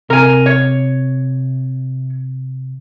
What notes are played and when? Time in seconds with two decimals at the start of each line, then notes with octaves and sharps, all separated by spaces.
0.10 C3 A#4 G#5
0.46 C#5